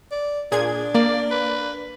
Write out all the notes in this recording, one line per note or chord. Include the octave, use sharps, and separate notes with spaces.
D5
A#2 D4 G#4 G#6
A#3 D5
B4